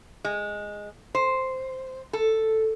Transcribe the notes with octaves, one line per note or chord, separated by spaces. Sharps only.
G#3
C5
A4